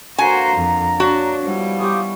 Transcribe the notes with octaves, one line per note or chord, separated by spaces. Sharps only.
D3 A#3 F#4 A#4 C5 G#5 A#5
F2
D4 F#4 C#5
F3 G3 B3 E4
E3 F4 G4 B4 C#6 D#6